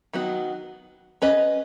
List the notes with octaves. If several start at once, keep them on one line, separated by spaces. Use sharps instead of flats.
D#3 F#3 B3 F#4
C#4 B4 D#5